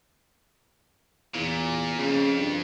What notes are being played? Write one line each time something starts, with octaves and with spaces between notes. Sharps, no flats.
E2 A#2
F2 C#3
G2